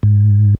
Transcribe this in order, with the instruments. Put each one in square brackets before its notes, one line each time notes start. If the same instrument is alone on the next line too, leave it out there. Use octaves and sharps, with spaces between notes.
[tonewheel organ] G#2